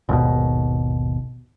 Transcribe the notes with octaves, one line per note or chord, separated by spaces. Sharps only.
G#1 D#2 B2